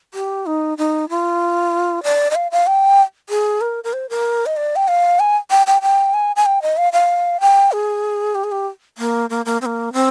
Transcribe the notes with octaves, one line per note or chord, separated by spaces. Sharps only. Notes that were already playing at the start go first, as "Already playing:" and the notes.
G4
D#4
D#4
F4
D5
D#5
F5
F5
G5
G#4
A#4
A#4
C5
A#4
D#5
D5
G5
F5
G#5
G5
G5
G5
G#5
G#5
G5
D#5
F5
F5
G5
G#4
G4
G#4
G4
A#3
A#3
A#3
C4
A#3
C4